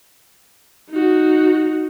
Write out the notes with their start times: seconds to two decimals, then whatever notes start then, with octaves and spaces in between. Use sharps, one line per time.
0.90 D#4 F#4